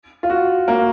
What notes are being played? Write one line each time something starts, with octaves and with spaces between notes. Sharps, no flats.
F4
F#4
A#3